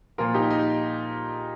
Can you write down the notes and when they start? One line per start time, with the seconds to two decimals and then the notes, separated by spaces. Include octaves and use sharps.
0.18 A#2 F3 F4 A#4
0.34 D#4 G4
0.50 D#4